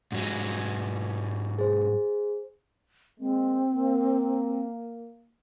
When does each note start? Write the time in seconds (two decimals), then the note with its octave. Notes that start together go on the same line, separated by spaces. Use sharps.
0.12 G#2 F#3 G#3
1.59 G#4 C5
3.20 G#3 A#3 C4
3.74 A#3